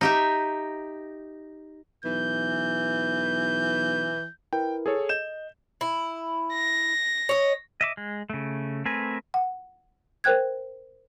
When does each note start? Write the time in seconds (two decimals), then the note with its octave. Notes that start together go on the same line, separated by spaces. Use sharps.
0.01 D#4 G4 E5
2.05 B1 E3 G6
4.53 E4 A#4 B4 G5
4.86 G#4 A4 C#5
5.09 D#5 G6 E7
5.81 E4
6.54 A#6
7.29 C#5 D#5
7.81 D#5 E5 D6
7.97 G#3
8.30 C#3 A3
8.85 A3 C4 A#4 B4 G#5
9.34 F#5
10.24 A#4 C5 G5 F#6 G#6